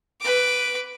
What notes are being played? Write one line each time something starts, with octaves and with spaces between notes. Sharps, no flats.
B4 D6